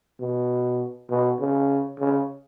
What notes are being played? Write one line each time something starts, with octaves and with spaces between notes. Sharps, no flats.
B2
B2
C#3
C#3